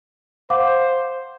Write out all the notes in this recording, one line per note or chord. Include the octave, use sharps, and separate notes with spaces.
C5 F5 F#5 D6